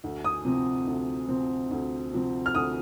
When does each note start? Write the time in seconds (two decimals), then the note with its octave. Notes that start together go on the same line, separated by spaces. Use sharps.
0.04 D2
0.25 D#6
0.45 C3 F3 C4
0.87 D2
1.29 C3 F3 C4
1.71 D2
2.13 C3 F3 C4
2.46 F6
2.55 D2 D#6